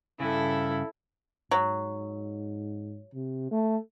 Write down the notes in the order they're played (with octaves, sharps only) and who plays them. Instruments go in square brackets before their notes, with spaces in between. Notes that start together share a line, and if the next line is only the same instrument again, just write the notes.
[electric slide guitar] G2 C#3 [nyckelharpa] E4 A4
[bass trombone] G#2 [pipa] F#3
[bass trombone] C3
A3